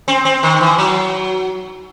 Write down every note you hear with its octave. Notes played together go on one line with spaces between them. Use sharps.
C4
C4
D#3
E3
F#3